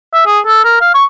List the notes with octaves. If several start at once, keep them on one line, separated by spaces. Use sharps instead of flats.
E5
G#4
A4
A#4
F5
C#6